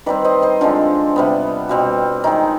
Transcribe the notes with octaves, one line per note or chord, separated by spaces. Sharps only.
D#3 G3 C4 B4 D5
C5 D#5
C5 D#5
D3 F3 G#3 C4 D4 F4
C3 G3 B3
B2 G3 C4
D#3 G#3 C4 D#4